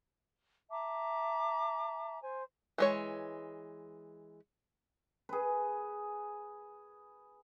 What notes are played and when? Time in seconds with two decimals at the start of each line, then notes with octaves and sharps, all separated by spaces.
0.70 E5 A5 A#5 D6
2.22 C5 G#5
2.78 E3 G#3 C#5
5.29 G#4 B4